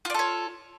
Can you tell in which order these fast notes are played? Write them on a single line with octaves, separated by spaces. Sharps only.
F4 D5 A4 C#5